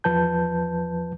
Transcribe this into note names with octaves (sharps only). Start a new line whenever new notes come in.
E2 F3 B4 A5 G6